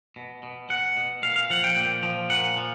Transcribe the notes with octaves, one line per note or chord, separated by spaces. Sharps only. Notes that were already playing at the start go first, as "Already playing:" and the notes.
B2
B2
B2 F#5
B2
A#2 F5
F5
F3 F#5
G5
A#2 G5
F3
A#2 F#5
F3